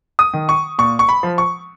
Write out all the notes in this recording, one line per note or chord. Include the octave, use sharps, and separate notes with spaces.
D#6
D#3
C#6
A#2 C#6
C#6
B5
F3
C#6